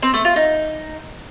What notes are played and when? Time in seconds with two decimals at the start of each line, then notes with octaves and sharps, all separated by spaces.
0.02 C4
0.14 A3
0.25 F4
0.36 D#4